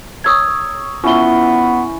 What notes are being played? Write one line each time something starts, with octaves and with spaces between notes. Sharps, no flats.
C#5 A#5 D#6 E6 G#6
B3 C#4 E4 F4 B4 G7